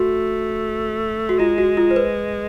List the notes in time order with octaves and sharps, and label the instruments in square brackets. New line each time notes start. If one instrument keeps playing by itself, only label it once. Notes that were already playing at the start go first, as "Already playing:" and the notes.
Already playing: [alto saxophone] A3 [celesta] F#4
[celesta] F#4
[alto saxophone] G#3 [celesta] F4
[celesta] F#4
F4
C5
B4